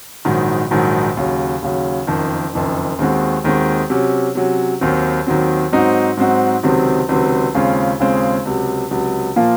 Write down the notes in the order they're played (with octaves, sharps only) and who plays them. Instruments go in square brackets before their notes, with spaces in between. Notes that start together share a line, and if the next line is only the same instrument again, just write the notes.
[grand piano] A#1 G#2 D#3 F#3
A#1 G#2 D#3 F#3
D#2 C#3 F#3
D#2 C#3 F#3
F#1 F2 D#3
F#1 F2 D#3
D#2 D#3 G#3 C4 F#4
D#2 D#3 G#3 C4 F#4
C3 F#3 C#4
C3 F#3 C#4
D#2 D#3 F#3 C4
D#2 D#3 F#3 C4
G#2 F#3 C4 D#4 F#4
G#2 F#3 C4 D#4 F#4
C#2 C3 D#3 F#3 C4
C#2 C3 D#3 F#3 C4
D#2 C#3 G#3 C4 F4
D#2 C#3 G#3 C4 F4
C#2 C3 F#3
C#2 C3 F#3
A#2 F3 A#3 F4